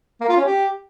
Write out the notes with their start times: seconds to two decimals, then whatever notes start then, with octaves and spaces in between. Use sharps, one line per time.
0.21 A#3
0.29 F4
0.37 C#4
0.45 G4